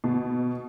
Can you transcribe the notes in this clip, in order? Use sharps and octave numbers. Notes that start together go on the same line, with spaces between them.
B2